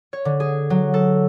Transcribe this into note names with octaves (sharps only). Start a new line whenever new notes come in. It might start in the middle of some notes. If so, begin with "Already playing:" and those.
C#5
D3
G#4
F#3
A4